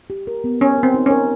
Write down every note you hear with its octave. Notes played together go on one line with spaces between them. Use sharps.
G4
A#4
B3
B3 C#4
C4 A#4
D#4
C#4
A#4